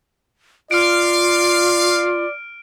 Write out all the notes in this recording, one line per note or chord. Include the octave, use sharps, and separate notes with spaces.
F4 D5 F5 F6 D7